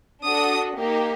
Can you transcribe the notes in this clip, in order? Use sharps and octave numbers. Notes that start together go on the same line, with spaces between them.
D4 F#4 A4 D#6
A#3 D#4 G4